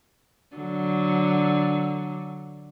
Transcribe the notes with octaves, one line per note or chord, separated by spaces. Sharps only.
D3 F#3